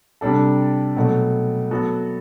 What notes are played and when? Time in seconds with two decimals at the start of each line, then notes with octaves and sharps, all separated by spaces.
0.21 C3 G3 D4 A4
0.96 B2 F#3 A3
1.71 F#3 B3 F#4 A4